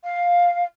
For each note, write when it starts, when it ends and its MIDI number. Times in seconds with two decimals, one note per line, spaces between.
0.03 0.64 77